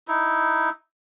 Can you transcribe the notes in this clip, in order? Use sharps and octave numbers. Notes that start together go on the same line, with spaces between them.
D#4 E4